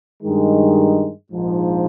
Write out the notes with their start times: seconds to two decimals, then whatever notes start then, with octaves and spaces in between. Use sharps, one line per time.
0.23 G2 D#3 G#3
1.32 A#1 G#2 F3